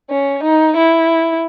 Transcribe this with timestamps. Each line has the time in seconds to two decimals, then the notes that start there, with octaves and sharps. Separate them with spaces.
0.10 C#4
0.43 D#4
0.76 E4